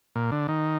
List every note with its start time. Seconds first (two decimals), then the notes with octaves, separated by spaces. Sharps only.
0.16 A#2
0.32 D3
0.48 D#3